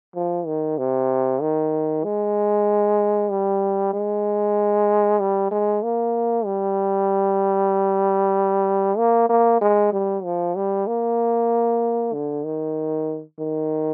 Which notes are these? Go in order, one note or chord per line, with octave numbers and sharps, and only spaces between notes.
F3
D#3
C3
D#3
G#3
G3
G#3
G3
G#3
A#3
G3
A#3
A#3
G#3
G3
F3
G3
A#3
D3
D#3
D#3